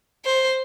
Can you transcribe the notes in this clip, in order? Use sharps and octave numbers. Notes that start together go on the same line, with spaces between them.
C5